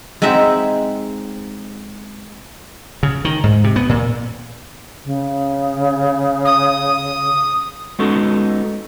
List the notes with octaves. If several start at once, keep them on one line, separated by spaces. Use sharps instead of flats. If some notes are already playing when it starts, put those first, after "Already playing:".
G#3 C4 D#4 E5 F#5
C#3
D#3
G#2
C3
B3
A#2
C#3
D#6
G#3 B3 C#4 D#4 F#4 A4